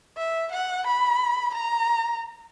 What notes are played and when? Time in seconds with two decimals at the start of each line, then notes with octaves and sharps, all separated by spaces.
0.17 E5
0.52 F#5
0.87 B5
1.54 A#5